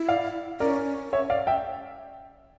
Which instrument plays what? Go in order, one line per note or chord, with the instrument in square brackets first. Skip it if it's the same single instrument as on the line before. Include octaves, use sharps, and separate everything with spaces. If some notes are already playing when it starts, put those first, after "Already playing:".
Already playing: [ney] E4
[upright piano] D5 F5
[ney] C#4 [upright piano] A#4 D5
[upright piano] C#5 E5
D5 F5
E5 G5